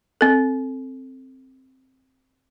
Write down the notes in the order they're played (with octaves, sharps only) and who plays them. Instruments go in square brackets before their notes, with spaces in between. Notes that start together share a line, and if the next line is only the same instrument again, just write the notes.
[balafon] C4 A4